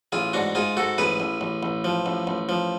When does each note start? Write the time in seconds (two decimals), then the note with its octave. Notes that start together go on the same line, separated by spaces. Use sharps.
0.12 A1 F4 G#4
0.33 G#2 D4 F#4
0.55 G#2 F4 G#4
0.77 G#2 F#4 A4
0.98 A1 G#4 B4
1.20 A1
1.41 A1
1.63 A1
1.84 F3
2.06 A1
2.27 A1
2.49 F3